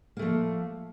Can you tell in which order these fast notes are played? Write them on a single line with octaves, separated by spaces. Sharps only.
A#3 A3 F3